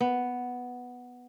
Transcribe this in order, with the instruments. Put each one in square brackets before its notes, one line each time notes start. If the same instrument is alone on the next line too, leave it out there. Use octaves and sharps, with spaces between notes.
[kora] B3